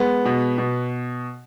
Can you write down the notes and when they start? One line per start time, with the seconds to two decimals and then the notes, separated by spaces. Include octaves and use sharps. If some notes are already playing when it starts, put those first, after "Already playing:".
Already playing: G#3 B3
0.25 B2
0.58 B2